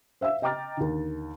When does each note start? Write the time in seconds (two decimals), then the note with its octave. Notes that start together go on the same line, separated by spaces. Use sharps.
0.21 C5 E5 F5 E6
0.42 D#5 G5 A#5 D6 F6 A6
0.77 D#2 D3